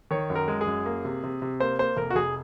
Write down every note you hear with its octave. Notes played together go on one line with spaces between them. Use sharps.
D#3 C#5
F#2
A#4
G#3
G#4
F#2
A#3
C3
C3
C3
A#3 C5
A#3 C5
F1 A#4
F#4
F1 G#4